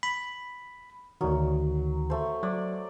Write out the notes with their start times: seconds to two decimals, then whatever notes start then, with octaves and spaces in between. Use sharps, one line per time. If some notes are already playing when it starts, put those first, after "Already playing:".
0.03 B5
1.21 D2 D#3 F#3
2.10 A3 C5
2.43 F#3 D5